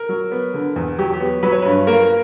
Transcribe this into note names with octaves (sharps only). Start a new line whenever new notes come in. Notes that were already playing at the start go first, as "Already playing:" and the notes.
Already playing: A#4
F#3
B3
D3
E2
F#3 G4
G4
B3
F#3 B4
C#5
G2 B4
A#3 A#4